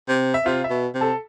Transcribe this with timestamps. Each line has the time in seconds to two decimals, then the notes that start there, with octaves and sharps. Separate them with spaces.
0.09 C3
0.34 E5
0.46 C3 F4 F5
0.64 E5
0.70 B2
0.95 C3
1.01 A4 A5